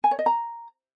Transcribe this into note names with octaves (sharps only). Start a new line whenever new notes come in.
G#5
C#5
D#5
A#5